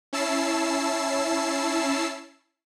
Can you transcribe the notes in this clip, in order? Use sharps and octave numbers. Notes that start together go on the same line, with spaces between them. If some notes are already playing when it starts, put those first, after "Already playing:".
C#4 E4 A5 E6 C7